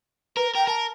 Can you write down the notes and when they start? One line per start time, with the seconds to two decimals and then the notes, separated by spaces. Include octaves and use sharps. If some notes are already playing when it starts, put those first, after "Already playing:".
0.37 A#4 B4
0.55 A#4 G5
0.67 A#4 A5